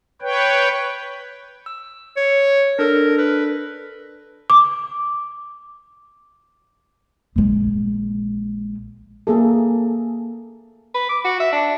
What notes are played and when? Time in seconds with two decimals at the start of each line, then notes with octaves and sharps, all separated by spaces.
0.22 B4 C#5 G5
1.66 E6
2.17 C#5
2.79 D4 A4 A#4
3.18 B4
4.50 D6
7.36 A#1 G#3
9.27 A#3 G#4 A4
10.94 B4
11.09 D6
11.25 F#4
11.40 E5
11.52 D4